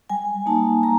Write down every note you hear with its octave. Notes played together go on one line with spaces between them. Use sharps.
G3 G#5
A#3 D#4 A5
G3 A#5